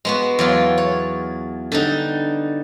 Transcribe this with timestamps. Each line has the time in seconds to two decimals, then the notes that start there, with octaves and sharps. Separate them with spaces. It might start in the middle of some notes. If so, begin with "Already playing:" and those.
0.05 G#3 B3 F#4
0.39 E2 F#3 F4
0.78 C#5
1.72 D3 G3 D#4